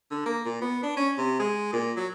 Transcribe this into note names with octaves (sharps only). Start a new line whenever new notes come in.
D3
A#3
A#2
B3
D4
C#4
C3
G#3
A#2
F#3